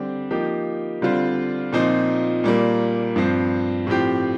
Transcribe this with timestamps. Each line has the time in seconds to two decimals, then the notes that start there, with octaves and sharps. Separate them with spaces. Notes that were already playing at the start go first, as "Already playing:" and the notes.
Already playing: D3 G3 C4 G4
0.31 F3 A#3 D#4 G4
1.02 D3 G3 C4 F4
1.73 A#2 F3 C4 D#4
2.44 A#2 G3 A#3
3.16 G2 F3 C4
3.87 A2 F3 C4 G4